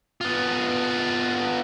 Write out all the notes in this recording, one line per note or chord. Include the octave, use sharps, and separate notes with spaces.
B3 F4